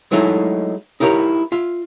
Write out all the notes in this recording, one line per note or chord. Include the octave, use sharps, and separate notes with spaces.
F#3 G#3 A3 D#4 E4
D#4 E4 G4 A#4 C#5
F4 E5